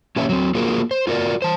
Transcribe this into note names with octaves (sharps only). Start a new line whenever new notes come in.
A#3 C#4 G4 B4 C#5 E5
F#3 C4
A#3 F4 F#4 G#4 A#4
C5
F4 F#4 A#4 C#5 D5
C5 A5